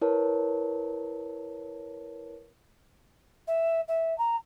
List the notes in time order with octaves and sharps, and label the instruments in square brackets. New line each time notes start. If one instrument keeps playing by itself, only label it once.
[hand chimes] E4 A#4 B4 C#5 A5
[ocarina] E5
E5
A#5